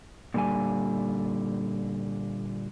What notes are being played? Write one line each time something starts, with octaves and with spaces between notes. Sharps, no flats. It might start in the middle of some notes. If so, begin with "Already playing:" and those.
A#2 D3 G3 D5 G#5